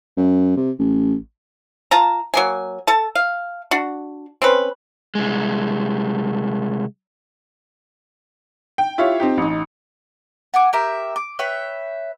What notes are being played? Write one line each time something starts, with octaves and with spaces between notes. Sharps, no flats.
F#2
C3
A1
F4 A5 A#5
F#3 A#3 G#5
A4 A5
F5
D4 F#4
C4 C#4 B4
C2 G#3
G5
E4 F4 G4 C#5 F5
C4 D#4 G4
A1 D#4
F#5 G#5 D6
G4 A#4 E5
D6
B4 C#5 E5 G5